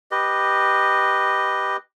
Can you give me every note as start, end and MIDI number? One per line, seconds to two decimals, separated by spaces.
0.11 1.77 67
0.11 1.77 71
0.11 1.77 75